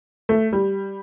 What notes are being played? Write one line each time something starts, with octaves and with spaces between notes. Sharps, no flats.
A3
G3